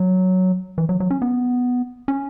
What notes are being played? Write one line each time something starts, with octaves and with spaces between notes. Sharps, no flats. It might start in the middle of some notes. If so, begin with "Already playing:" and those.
Already playing: F#3
E3
F#3
F#3
C#4
B3
C#4